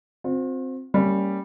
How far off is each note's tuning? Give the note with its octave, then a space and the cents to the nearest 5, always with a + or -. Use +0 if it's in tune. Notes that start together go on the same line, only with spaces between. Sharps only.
C4 +0 F4 +45
G3 +0 A#3 -30 C#4 +0